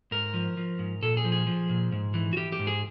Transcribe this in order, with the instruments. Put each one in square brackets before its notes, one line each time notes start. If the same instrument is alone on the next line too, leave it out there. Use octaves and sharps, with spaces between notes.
[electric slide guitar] G#2 A#4
F3
F3
G#2
A#2 A4
G#4
F3
G#4
F3
A#2
G#2
E3
F#4
E3 G4
G4
G#2
G#4